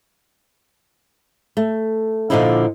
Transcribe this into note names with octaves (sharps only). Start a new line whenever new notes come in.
A3
A#2 D3 D#3 F3 D#4 E4